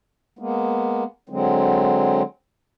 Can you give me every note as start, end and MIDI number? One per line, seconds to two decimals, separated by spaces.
0.39 1.04 56
0.39 1.04 58
0.39 1.04 59
1.29 2.22 50
1.29 2.22 54
1.29 2.22 56
1.29 2.22 60